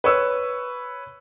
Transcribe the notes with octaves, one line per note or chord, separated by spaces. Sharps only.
B4 C#5 C#6 E6